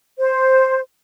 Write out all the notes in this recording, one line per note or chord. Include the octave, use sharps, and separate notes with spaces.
C5